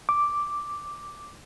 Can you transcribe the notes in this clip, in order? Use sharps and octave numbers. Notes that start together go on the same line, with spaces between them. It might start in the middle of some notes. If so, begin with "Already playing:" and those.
D6